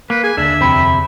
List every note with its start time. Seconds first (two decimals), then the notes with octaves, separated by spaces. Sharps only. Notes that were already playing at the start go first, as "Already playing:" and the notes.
0.10 A#3 B4
0.24 G#4 G#5
0.37 D#2 D3 D4 E5
0.61 F2 C3 C4 B5